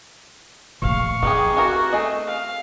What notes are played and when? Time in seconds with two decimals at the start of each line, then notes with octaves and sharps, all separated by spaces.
0.82 A#1 A3 F5 C#6
1.23 B3 C4 D#4 G4 G#4 G#5
1.57 E3 F#4 G4 A#4
1.93 A3 G#4 D#5
2.27 F5